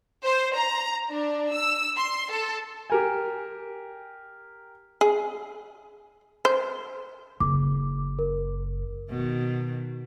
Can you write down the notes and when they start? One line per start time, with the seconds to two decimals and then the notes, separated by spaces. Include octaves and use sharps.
0.24 C5
0.56 A#5
1.10 D4
1.53 E6
1.97 C6
2.31 A4
2.90 G4 A#4 G#5
5.01 G#4
6.45 C5
7.40 F#1 D6
8.19 A#4
9.09 B2 D#3